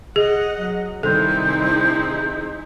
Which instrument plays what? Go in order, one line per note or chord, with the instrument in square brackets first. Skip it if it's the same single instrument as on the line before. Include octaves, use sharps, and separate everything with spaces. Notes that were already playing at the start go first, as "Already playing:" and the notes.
[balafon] G#4 [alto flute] D#5 [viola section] F#5
[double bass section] F#3
[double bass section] C3 D#3 G3 [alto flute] C4 [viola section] D#4 E4 G#4 [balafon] A4